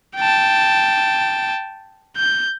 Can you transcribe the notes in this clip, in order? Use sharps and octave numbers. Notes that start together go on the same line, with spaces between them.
G5 A5
G6